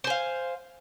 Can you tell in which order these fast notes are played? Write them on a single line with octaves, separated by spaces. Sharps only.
C5 G#5 F5